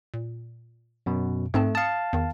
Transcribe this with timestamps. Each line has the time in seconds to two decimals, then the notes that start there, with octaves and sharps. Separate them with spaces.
0.14 A#2
1.06 F#2 B2
1.54 G#2 A3 C4 A5
1.75 F5 A5 D#6 C#7
2.13 E2 D#3